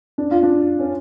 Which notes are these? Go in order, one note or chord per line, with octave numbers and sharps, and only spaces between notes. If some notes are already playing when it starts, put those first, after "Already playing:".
D4
F4
D4
C#4